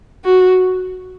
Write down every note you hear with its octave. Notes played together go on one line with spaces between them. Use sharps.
F#4